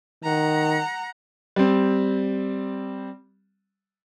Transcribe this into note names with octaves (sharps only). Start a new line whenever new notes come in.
D#3 F#5 A#5
G3 C4